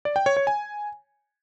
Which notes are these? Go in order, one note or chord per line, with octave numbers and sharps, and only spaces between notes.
D5
G5
C#5
C#5
G#5